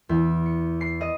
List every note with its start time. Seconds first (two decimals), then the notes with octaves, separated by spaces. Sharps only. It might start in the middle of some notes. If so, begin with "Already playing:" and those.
0.09 E2
0.46 C#7
0.81 C7
1.01 D#5